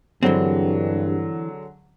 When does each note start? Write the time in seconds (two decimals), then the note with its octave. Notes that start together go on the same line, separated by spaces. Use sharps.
0.23 G2 D3 E3 F#3 G#3 C4